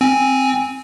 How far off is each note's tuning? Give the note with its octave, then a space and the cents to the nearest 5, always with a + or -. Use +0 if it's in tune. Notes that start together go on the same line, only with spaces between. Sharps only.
C4 +0 G#5 +0